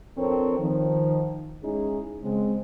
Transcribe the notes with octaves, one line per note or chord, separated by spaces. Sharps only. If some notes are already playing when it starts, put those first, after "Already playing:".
F3 C4 D4 A4 A#4 C#5
D#3 F3
G#3 C#4 D#4 E4 G#4
C#3 G#3 C4